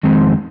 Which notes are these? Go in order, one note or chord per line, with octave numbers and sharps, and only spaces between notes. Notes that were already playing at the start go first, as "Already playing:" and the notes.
F2 D#3 G#3 C4 D#4